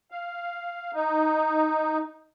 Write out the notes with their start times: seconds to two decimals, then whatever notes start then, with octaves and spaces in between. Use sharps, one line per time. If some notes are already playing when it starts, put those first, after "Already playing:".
0.11 F5
0.94 D#4